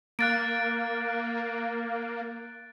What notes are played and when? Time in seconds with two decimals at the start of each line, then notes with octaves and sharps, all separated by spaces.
0.19 A#3 F#6 A6 D7